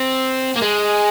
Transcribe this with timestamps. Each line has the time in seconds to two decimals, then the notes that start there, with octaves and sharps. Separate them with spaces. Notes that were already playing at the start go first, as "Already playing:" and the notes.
Already playing: C4
0.56 A#3
0.62 G#3